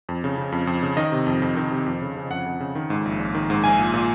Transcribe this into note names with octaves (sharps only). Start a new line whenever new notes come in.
F2
C#3
C#3
F2
F2
C#3
D#3 D#5
C3
F2
F2
D#3
C3
F2
C#3
C#3
F2 F#5
F2
C#3
D#3
G#2
A#1
A#1
D#3
G#2
A#1 G#5
A#2
A#2